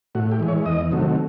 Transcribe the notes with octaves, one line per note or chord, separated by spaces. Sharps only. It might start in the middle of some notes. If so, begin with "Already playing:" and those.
A2 F#4
G4
E3 G#3
C#5
E2 D#5
C3 D#3 F#3 A3